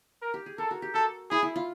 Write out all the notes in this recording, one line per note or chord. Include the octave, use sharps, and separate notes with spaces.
A#4
G4
G#4
A4 A#4
F#4
G4
F#4 A4
E4 G#4
E4
F4